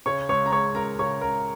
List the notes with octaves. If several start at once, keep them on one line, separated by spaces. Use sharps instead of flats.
C#3 C#5 C#6
C#2 C#5 C#6
A#5
G#3 C#5 C#6
C#2 A#4 A#5
C#3 C#5 C#6
C#2 A#4 A#5